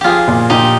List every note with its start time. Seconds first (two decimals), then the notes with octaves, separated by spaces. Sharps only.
0.01 F3 F4 G4 G#4
0.28 A#2
0.50 A#2 D#4 G4